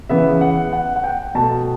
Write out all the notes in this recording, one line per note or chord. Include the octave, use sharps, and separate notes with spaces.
C#3 E3 B3 E5
F#5
F#5
F#5
G5
B2 A3 A5